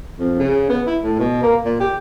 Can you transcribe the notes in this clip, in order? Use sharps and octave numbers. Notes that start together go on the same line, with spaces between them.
F2
C#3
B3
E4
A2
B2
A#3
A#2
G4